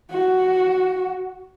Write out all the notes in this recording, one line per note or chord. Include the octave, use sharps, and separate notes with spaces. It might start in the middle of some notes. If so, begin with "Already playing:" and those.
F#4